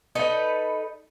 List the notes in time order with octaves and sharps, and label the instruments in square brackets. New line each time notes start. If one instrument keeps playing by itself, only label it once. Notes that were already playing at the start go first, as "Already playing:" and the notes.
[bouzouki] D#4 A4 B4